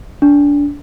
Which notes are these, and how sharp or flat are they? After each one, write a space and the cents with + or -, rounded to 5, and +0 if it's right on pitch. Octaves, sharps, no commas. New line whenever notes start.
D4 -25